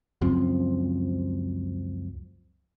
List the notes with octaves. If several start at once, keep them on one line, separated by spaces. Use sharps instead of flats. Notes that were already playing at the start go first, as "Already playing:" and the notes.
C#2 F#2 F3 C4